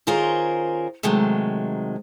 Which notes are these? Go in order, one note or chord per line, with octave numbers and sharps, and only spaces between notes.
D#3 C#4 F4 G#4 A#4 C5
C3 D#3 F#3 G#3 A3